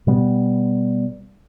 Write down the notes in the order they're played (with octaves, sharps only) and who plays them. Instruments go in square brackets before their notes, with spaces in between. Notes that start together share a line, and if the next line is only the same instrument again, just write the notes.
[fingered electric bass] B2 G3 B3